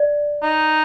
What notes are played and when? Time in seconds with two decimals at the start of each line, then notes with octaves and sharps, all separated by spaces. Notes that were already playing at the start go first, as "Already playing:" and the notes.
Already playing: D5
0.43 D#4